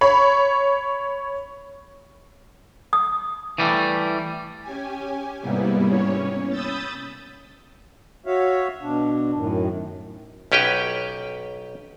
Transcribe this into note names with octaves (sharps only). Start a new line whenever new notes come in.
C#5 B5
D#6
E3 G3 A3
C#4 G4 G#5
G#2 C3 G3 A#3 B3 E4
C#4 C#5
B5 D#6 E6 G6 A6
F#4 C#5 E5 F5
B2 D4
F#2 A2 D#3
B1 C#4 G4 B4 G5